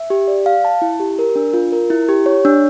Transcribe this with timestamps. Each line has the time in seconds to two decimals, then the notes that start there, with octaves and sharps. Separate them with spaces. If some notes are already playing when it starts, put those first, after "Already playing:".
Already playing: E5
0.10 G4
0.28 D5
0.46 F5
0.65 A5
0.82 E4
1.00 G4
1.19 A#4
1.36 D4
1.54 F4
1.72 A#4
1.90 E4
2.09 G4
2.26 C#5
2.45 D4